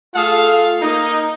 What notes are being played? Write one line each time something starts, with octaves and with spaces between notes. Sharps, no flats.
A3 F4 G#4 A4 F5
A#3 D#4